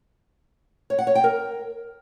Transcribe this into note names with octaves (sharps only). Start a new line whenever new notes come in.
C#5
F#5
C#5
G5
A#4